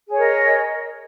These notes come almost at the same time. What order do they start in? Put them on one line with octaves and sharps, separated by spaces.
G#4 C#5 A#4 D#5